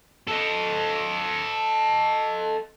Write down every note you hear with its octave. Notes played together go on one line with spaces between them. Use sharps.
A4 D#5